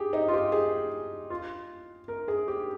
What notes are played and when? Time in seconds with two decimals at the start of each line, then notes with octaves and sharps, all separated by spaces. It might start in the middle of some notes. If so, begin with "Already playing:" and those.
Already playing: G4 G#4
0.13 D#4
0.28 F4
0.34 G4
0.52 G#4
1.30 F4
2.08 A#4
2.28 G#4
2.48 G4